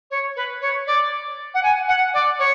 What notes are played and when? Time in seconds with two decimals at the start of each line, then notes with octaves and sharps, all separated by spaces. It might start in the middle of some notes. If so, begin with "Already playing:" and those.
0.10 C#5
0.36 B4
0.61 C#5
0.86 D5
1.54 F#5
1.63 G#5
1.88 F#5
2.13 D5
2.39 C#5